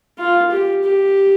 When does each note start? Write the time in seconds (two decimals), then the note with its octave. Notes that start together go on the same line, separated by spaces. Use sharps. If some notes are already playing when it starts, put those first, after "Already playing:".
0.18 F4
0.51 G4
0.84 G4